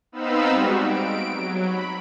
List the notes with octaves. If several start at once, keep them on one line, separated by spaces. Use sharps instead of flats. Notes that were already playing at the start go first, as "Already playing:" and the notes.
B3 C4 D#4 F5 B5 E6
G3 G#3 F#4
D7
F#3
B5